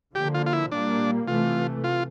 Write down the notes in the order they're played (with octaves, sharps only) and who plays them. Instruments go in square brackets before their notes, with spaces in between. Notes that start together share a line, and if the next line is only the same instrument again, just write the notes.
[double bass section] D3 F3 A#3 [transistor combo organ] G4
[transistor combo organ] F4
F4
E4
[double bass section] A#2 G3 A#3 [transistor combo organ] D4
[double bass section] C3 E3 A3 [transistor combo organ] F4
[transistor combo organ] F4